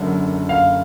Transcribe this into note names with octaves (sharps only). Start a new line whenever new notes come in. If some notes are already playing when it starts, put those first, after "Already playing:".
Already playing: F#1 F#2 D3
F5